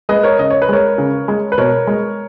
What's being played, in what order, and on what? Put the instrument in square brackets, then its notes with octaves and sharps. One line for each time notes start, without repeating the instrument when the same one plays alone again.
[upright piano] G#3 B4 D#5
A#4 C#5
C#3 D#5
C#5
B4
G#3 A#4 C#5
C#3
G#3
B4
B2 A#4 C#5
G#3